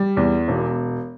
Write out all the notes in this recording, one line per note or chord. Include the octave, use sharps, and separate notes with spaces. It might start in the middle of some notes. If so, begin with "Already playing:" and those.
Already playing: G3
E2
E1